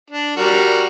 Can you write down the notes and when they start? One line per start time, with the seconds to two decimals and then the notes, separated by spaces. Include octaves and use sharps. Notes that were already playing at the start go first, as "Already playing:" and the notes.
0.11 D4
0.37 G3 F#4 A#4